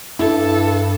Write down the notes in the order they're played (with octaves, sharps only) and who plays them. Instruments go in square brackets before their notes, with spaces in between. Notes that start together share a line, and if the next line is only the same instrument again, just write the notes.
[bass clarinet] G2 [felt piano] E4 [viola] A4